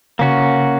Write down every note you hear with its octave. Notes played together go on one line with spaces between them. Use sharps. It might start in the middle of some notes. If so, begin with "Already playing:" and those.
C#3 A#3 C#4 F#4